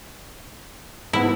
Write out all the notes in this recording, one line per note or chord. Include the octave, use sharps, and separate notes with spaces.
G#2 B3 E4